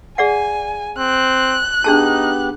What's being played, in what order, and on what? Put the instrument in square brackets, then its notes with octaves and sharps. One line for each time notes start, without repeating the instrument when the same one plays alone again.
[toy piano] G#4 D5 F#5 [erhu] G#5
[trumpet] C4 [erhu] F#6
[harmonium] B3 G4 [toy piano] D4 G#4 A5 [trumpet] D#4